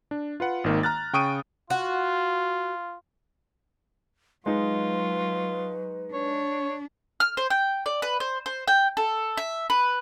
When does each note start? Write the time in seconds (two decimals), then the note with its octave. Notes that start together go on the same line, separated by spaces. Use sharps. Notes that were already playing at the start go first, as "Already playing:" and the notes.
0.11 D4
0.40 F4 B4 F#5
0.64 G#1 D#3 A#3
0.83 A#5 F6 F#6 A6
1.13 C#3 G5 C#6 D#6 D7 D#7
1.70 F4 F#4
4.46 F#3 G#3 D#4 F4 B4
6.13 D4 C#5
7.20 F6
7.37 C5
7.50 G5
7.86 D5
8.02 B4
8.20 C5
8.46 C5
8.68 G5
8.97 A4
9.37 E5
9.70 B4